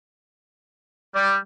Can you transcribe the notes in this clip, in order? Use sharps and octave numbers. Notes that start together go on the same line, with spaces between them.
G3 D5